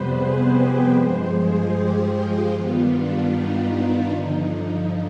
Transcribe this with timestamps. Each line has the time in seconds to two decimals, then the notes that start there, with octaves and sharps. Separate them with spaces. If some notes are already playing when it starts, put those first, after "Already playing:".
Already playing: F2 C3 G3 B3 B4 C5
0.12 G#4
0.51 G4
0.91 G2 F3 G#3 C5
1.32 G#4
1.71 G4
2.11 F4
2.51 G2 D#3 G3 B3
2.91 D4
3.31 D#4
3.70 D4
4.10 G2 D3 F3 D#4